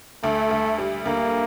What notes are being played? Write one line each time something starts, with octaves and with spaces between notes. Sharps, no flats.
D2 A3
D2
G3
D2 A#3